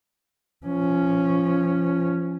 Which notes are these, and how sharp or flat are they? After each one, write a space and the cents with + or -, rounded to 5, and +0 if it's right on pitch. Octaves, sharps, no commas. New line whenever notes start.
F3 -20 C#4 +0